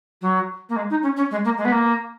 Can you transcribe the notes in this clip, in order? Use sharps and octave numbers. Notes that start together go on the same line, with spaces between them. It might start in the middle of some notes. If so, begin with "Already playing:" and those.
F#3
A#3
G#3
D#4
C#4
C#4
G#3
A#3
G#3
B3
A#3